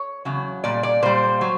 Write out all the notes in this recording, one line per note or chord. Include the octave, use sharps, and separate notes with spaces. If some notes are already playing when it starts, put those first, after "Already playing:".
Already playing: C#5
E2 C#3 F#3
A#2 G3 D5
D5
A#2 G3 C5
F#3